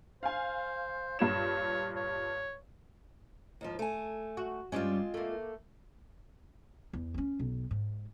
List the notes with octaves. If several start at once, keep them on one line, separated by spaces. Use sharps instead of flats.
C5 F5 G#5
G2 A#2 C#5 E7
C#5
D#2 G#2 F3
A3 G#5
F#4
G2 G3 G#3 C4 C#4 F4
A3 A#3
E2
B3 C#4
B1
G#2